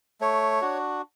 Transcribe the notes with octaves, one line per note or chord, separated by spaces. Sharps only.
A3 C#5
D4 F#4